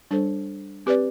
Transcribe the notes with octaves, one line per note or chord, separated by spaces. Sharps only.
G3 D4 A4 C5
C4 G4 B4 D5